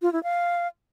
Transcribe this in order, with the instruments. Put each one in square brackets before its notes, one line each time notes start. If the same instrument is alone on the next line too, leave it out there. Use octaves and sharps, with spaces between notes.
[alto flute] F4
E4
F5